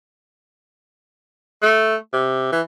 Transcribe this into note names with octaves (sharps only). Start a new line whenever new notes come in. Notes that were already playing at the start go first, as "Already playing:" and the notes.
A3
C3
E3